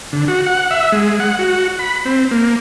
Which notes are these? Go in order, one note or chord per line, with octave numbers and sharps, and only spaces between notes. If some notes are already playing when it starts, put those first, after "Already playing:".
D3
F#4
F#5
E5
G#3
F#5
F#4
B5
C4
A#3